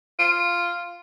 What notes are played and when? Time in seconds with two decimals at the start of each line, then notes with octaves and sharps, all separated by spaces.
0.19 F4